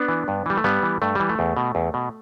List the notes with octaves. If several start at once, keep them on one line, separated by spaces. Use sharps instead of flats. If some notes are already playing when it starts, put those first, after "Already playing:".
Already playing: B3 D4
E3
G2
E3 G3
A3
G2 G3 B3
E3
G2 A3
E3 G3
A3
E2
B2
E2
B2